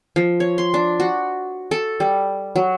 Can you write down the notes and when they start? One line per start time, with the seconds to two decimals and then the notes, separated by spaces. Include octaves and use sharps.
0.16 F3
0.40 C#5
0.58 C6
0.74 D4
1.00 F#4
1.71 A4
2.00 G3
2.56 F#3